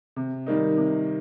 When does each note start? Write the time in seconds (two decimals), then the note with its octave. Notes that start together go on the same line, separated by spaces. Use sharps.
0.16 C3
0.46 D#3 G3 A#3 D#4
0.77 C3